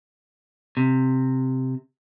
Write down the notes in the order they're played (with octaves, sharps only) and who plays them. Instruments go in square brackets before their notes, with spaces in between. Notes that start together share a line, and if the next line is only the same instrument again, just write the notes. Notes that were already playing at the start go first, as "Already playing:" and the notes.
[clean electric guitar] C3